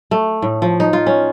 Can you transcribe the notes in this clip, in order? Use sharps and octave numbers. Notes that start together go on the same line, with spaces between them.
A3
A2
F3
D#4
F4
C#4